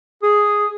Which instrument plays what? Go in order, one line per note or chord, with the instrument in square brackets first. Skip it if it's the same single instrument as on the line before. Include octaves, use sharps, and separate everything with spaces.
[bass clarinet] G#4